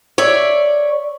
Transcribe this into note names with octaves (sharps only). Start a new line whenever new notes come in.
C#5 D5 E5